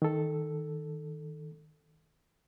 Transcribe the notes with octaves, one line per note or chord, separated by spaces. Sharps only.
D#3 A4